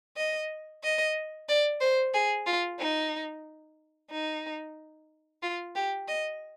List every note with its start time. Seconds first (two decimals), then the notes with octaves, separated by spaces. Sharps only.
0.16 D#5
0.83 D#5
1.48 D5
1.81 C5
2.14 G#4
2.46 F4
2.79 D#4
4.10 D#4
5.42 F4
5.75 G4
6.08 D#5